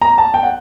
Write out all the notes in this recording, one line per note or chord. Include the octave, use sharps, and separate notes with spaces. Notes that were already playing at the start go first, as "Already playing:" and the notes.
A#5
A5
G5
F#5